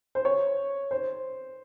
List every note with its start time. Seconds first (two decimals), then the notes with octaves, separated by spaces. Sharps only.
0.15 C5
0.25 C#5
0.91 C5